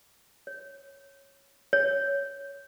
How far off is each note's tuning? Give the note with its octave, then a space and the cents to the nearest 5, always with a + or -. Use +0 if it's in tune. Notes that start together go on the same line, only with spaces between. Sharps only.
C#5 -5
C#5 +10